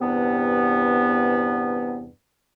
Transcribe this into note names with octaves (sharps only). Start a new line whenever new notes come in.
E2 G2 C3 B3